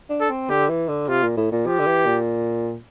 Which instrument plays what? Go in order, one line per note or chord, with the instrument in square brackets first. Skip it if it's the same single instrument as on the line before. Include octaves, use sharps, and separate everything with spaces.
[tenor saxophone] D4
[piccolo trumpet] A4
[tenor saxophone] C4
[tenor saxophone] D3 [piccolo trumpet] G4
[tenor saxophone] E3
D3
[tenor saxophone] C3 [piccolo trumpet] F4
[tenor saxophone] A#2
A2
A#2
[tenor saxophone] F3 [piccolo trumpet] G4
[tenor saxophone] D3
E3
A#2